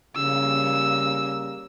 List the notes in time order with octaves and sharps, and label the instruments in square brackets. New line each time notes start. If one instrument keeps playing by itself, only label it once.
[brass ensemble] C#3 G3 A#3 [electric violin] E6